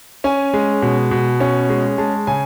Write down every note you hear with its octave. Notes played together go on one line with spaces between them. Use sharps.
C#4 G#5
G#3
B2
B2
C#4
G#3
G#3 A5
C#3 G#5